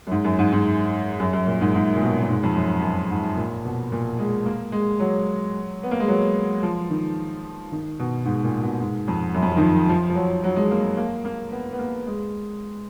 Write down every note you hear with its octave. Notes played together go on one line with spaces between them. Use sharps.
F#2
G#2
F#2
G#2
G#2
F#2
F#2
A#2
G#2
G#2
A#2
B2
A#2
G#2
F2
F#2
F#2
G#2
A#2
B2
A#2
G#3
A#3
G#3
F#3
B3
A#3
G#3
F#3
F3
D#3
D#3
B2
G#2
A#2
B2
G#2
F2
F#2
F2
F#2
D#3
F3
F3
F3
F#3
F#3
G#3
A#3
G#3
A#3
A#3
B3
B3
A#3
G#3